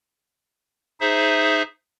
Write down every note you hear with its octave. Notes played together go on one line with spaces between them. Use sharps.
D#4 G#4 C5 E5